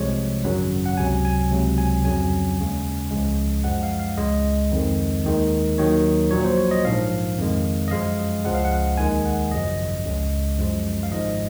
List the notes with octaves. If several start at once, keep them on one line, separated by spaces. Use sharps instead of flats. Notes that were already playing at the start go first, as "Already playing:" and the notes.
Already playing: C2 C3 F3 G#3 C#5
G#1 F#2 C#3 F#3
F#5
C#2 C3 F#3 G#5
G#5
C#2 C3 F#3
G#5
F2 C#3 F#3 G#5
D#2 C#3 G#3
C#2 C#3 F3 G#3
F#2 F3 G#3 F#5
F5
F5
C#2 C#3 G#3 D#5
F2 D#3 G#3
D#2 D#3 G#3
D#2 D#3 F#3 C#5
A#1 A#2 F#3 C#5
C5
C#5
D#5
A#1 G#2 F3 F5
F2 D#3 G#3
D#5
F#2 F3 G#3 F5
C#2 C#3 F3 G#3 F#5
F5
F#5
D#2 D#3 G#3 G#5
F#5
G#1 F#2 C#3 F3 D#5
C#2 C#3 G#3
F#2 F3 G#3
F5
G#1 G#2 F3 G#3 D#5